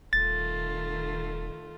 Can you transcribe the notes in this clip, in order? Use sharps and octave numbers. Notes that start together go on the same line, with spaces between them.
D#1 D#3 A3 F4 A6